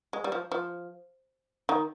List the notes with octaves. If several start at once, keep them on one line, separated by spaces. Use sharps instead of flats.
G#3
G3
F3
F3
D#3